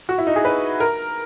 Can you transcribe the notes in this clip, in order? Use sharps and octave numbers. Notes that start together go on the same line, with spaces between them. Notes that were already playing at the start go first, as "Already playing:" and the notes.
F#4
E4
D#4
G#4
B4
A#4